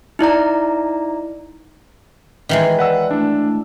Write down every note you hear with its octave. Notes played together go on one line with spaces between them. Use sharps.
D#4 E4 D5 A#5
D#3 E3 G#3 B4
B4 D5 F#5 E6
A3 D4 E4